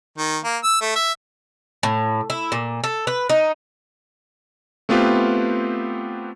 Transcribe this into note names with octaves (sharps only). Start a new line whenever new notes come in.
D#3
A#3
E6
A3
E5
A2
E4
A#2
A4
B4
D#4
A3 B3 C4 F4 G4 B4